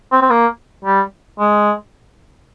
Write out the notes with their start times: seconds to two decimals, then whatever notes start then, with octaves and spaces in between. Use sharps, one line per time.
0.12 C4
0.22 C4
0.30 A#3
0.85 G3
1.39 G#3